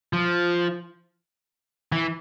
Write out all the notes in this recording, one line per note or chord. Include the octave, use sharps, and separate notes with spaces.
F3
E3